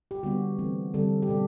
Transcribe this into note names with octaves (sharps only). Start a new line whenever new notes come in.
G4
D3 G3 B3 F#4
E3 A3 C4
D3 G3 C4 A4
G4
B2 G3 B3 A4